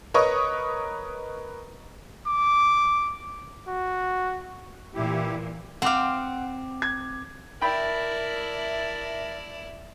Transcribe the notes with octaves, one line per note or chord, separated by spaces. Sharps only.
A#4 B4 C#5 D#5 C#6 D#6
D6
F#4
A#2 E3 E4 G4
C4 F5 F#5 D6
G#6
E4 A#4 D5 E5 G5 A5 B5